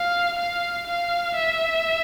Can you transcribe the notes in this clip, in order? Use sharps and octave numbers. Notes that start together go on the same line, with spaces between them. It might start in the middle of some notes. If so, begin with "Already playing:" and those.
Already playing: F5
F5
F5
E5